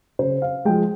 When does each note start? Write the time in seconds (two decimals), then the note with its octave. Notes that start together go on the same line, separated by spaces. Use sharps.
0.19 C#3 C5
0.42 F5
0.65 F3 G#3 G5